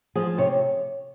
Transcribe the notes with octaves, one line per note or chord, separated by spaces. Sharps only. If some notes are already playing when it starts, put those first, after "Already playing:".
F3 G#4
C3 C#5